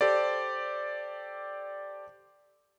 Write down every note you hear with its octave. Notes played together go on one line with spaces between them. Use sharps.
G4 A4 C5 D5